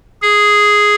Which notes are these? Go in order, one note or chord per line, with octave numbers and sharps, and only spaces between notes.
G#4